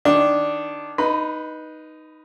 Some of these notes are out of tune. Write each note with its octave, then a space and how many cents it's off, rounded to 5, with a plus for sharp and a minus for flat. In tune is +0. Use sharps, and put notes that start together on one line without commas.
D#3 +0 D4 +0
D#4 +0 B4 -15 B5 +30